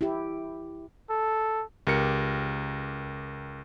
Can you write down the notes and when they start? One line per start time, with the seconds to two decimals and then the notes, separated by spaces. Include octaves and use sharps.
0.01 E4 G4
1.10 A4
1.87 C#2 G4 A#4 C#7